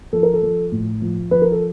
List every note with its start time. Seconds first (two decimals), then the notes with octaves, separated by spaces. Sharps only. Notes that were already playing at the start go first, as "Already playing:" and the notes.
0.13 F3 A4
0.23 A#4
0.34 A4
0.43 F3
0.72 A2
1.02 F3
1.31 F3 B4
1.42 A#4
1.52 A4